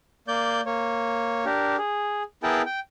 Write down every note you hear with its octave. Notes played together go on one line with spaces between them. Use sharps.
A#3 D5 G6
A#3 C#5
D4 G4 A#4
G#4
B3 E4 G#4 A#4 G5 A5
G5